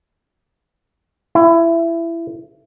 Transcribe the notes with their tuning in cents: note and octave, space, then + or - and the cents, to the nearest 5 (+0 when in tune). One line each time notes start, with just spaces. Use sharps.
E4 +20